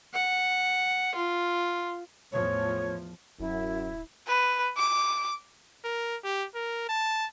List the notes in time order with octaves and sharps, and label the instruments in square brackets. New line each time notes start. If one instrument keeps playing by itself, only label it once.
[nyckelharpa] F#5
F4
[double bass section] E2 A2 F3 [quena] C#5
[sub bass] D1 [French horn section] F#2 [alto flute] E4
[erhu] B4
D6
[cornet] A#4
G4
A#4
A5